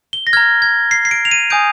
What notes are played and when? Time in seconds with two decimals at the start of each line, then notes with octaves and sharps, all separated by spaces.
0.13 G7
0.27 A#6
0.33 A#5 F6 G#6
0.62 G#6
0.91 C7
1.05 C7
1.11 D7
1.25 F7
1.31 D#7
1.50 G#5 D#6 G6 D7